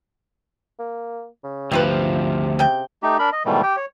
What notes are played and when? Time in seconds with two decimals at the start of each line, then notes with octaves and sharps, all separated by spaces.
0.79 A#3
1.43 C#3
1.71 D2 C3 F3 C4 F4 B4
2.59 C#3 G5
3.03 A3 D#4 G4
3.19 D4 A#4 B5
3.32 D#5
3.45 G#2 B2 D#3 E3 G3 A3
3.63 G4 G5
3.77 C#5